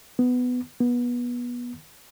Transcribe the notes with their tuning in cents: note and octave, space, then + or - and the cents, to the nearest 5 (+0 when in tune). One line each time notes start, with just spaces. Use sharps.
B3 +10
B3 -25